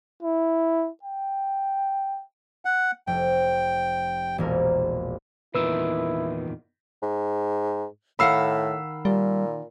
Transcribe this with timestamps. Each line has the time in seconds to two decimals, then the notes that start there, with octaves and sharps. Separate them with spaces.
0.23 E4
1.03 G5
2.65 F#5
3.07 F1 G5
4.38 E1 A#1 A#4
5.55 E2 A#2 D#3 E4 B4 E6
7.02 G#2
8.19 A2 D#3 F5 F#5 B5 E6 C7
9.05 A#2 G3